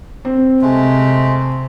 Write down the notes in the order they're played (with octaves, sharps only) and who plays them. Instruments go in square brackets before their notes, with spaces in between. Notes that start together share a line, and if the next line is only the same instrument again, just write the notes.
[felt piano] C4
[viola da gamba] C3 [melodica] G#3 A3